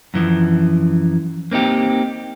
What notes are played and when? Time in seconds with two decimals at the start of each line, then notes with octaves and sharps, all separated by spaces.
0.14 F#2 E3 F3
1.51 A#3 C4 D#4 G4